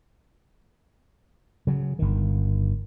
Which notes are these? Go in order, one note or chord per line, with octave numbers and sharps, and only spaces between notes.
C#3 F#3
G1 D#3